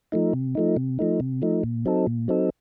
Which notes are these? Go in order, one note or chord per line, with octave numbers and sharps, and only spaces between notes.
F3 A3 D#4
C3
F3 A3 D#4
C3
F3 A3 D#4
C3
F3 A3 D#4
A#2
F#3 C4 D#4 A4
A#2
F#3 C4 D#4 A4